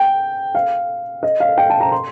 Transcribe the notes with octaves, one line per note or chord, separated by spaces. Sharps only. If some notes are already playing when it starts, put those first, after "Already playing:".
Already playing: G5
F5
D#5
F5
G5
A5
A#5
C6